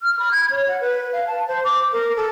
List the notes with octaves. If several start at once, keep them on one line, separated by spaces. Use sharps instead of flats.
F6
B5
G#6
C#5
F#5
B4
F5
A5
C5
D6
A#4
A4